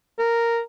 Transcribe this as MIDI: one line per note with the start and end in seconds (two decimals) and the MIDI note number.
0.19 0.60 70